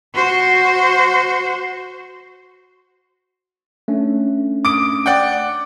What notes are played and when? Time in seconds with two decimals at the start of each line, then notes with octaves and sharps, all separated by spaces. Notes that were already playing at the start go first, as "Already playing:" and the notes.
0.14 F#4 C5
3.88 A3 C#4 D4
4.65 D6 D#6 D7
5.06 D5 F#5 G5